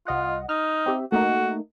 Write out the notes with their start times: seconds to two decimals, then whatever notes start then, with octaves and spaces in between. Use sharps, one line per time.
0.07 C2 F4 D#5 F#5
0.49 D#4 F6
0.86 C4 G4 E5
1.12 A3 A#3 D#4 F#4